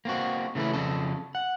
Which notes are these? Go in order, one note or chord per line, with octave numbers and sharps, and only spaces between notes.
A#3 C4 F#4
C#3 E3 A3 C#4 E4
F2 C#3 A4
F#5